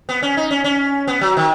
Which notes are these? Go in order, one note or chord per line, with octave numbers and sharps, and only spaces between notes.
B3
C#4
D#4
C#4
C#4
B3
F#3
D#3